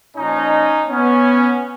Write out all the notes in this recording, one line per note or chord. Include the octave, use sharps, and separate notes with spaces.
A#2 F3 C#4 D#4
B3 C#4